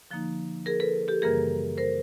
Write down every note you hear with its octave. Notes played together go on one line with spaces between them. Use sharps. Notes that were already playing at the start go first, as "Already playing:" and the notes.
D3 F3 A#3 D#4
G#4 A#4
A4 B4
G4 A4
F#2 C#3 E3 G3 A#3 G#4 A#4
A#4 C5